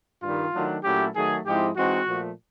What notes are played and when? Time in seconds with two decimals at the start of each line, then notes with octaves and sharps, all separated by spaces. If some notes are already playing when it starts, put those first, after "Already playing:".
0.23 G2 D#3 G3 F4
0.54 D#3 F#3 A3 D4
0.84 A#2 F#3 A3 C#4 E4 G4
1.15 D#3 F#3 A3 G#4
1.46 G#2 F3 G#3 C4 E4 G4
1.77 E3 G#3 C4 D#4 F#4
2.07 A#2 F3 A3